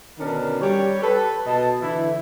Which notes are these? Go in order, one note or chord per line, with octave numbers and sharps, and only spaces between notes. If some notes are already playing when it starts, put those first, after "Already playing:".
B2 D3 D#3 C#4 D4 A#4
G3 G4 C#5
A4 B4
B2 D#5 A5
D3 E3 E4